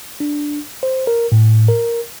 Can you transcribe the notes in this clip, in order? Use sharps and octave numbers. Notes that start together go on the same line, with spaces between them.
D4
C5
A#4
A2
A#4